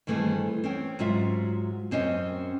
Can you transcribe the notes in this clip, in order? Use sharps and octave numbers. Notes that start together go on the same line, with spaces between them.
G2 D#3 E3 A3 C4 G#4
C4 C#4 G5
G#2 F#3 F4 E5
F#2 C4 C#4 D#5